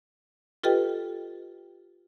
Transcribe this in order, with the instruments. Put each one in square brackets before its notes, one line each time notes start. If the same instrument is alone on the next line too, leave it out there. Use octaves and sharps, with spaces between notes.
[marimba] F4 G4 A4 B4 D#5 G5